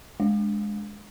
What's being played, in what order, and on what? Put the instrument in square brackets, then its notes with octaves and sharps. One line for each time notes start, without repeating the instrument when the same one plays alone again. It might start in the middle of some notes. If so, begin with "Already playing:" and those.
[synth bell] G#3